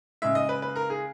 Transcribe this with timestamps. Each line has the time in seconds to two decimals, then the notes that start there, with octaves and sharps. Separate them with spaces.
0.22 C#3 G#3 E5
0.35 D#5
0.49 B4
0.62 B4
0.76 A#4
0.90 G#4